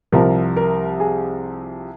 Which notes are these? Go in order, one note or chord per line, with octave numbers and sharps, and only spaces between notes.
C2 C3 F3 A#4
A#4
G#4